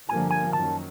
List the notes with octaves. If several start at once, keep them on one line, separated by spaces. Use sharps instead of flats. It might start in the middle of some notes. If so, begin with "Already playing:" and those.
G2 D3 F3 A#3 G#5
G#5
F#2 D#3 F#3 A5